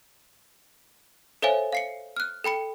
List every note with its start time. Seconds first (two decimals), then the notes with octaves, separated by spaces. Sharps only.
1.42 A4 C5 C#5 E5 F5 G#5
1.72 F5 C7 C#7
2.17 F6 F#6
2.44 A4 G5 B5 C#7